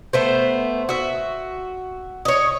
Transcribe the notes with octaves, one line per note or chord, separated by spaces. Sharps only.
A3 B3 C5
F#4 E5
C#5 D#5